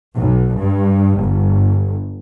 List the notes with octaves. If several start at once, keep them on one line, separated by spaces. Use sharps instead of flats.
B1
G2
G1